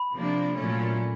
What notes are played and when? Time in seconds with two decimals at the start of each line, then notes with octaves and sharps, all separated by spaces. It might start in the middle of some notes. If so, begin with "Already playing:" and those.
Already playing: B5
0.13 C3 F3 A#3 D4
0.56 A#2 F#3 A3 C#4